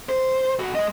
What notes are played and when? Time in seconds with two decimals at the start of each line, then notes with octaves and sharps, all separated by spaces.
0.09 C5
0.59 B1 F#4
0.75 G#3 D#5